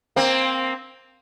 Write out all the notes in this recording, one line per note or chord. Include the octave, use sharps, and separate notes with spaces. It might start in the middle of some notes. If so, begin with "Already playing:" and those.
A#3 C4